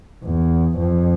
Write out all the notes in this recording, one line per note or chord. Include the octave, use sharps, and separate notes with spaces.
E2
F2